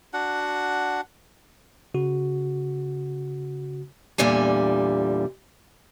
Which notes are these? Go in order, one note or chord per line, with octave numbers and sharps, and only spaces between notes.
D4 F#4 F#5
C#3 F#4
E2 A#2 D3 G3 G#5